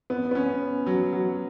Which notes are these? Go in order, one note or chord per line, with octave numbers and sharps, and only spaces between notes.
B3
B3
C#4
F#3
F#3